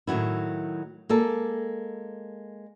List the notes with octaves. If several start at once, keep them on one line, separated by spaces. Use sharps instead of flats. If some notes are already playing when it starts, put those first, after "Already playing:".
A2 D#3 F3 F#3 E4
G#3 A#3 A4